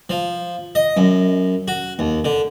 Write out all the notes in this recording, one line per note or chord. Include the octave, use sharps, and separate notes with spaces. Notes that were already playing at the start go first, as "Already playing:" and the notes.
F3
D#5
F#2
F#4
D#2
D3